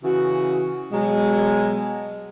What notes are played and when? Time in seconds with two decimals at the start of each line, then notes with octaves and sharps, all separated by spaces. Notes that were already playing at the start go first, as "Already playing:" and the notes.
0.03 C#3 E3 F#4
0.92 B2 F#3 G#3